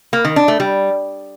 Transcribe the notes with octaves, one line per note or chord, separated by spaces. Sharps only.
A#3
D#3
D4
A3
G3